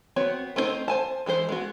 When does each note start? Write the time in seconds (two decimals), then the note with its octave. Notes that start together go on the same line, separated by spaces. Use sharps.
0.16 B3 C4 F#4 C#5
0.56 A3 C4 D4 D#4 C5
0.88 C5 G#5 A5
1.26 E3 G#3 G#4 C5
1.49 G#3 B3 F#4